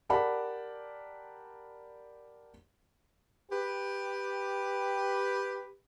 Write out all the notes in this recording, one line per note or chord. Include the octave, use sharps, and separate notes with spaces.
G4 A#4 D5 F#5 A5 B5
G4 B4